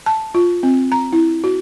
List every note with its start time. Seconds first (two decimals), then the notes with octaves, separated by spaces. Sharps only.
0.06 A5
0.35 F4
0.63 C4
0.92 A#5
1.13 E4
1.44 F#4